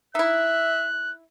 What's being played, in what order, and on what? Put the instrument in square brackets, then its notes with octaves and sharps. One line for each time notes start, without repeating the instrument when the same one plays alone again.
[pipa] D#4 E4 [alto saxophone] E5 [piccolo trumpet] F#6